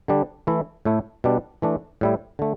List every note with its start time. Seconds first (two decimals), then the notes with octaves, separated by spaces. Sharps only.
0.08 D3 G3 D4
0.47 E3 A3 E4
0.85 A2 A3 E4
1.24 B2 G3 D4
1.62 E3 A3 D4
2.01 A2 G3 E4
2.39 D3 A3